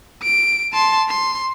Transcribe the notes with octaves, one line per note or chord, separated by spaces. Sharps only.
D7
A5 C6
C6